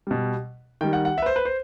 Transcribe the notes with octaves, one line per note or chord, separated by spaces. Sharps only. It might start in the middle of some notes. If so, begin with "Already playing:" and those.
B2 G3
D#3 G3 G5
F#5
F#5
E5
B4
C5
B4
C5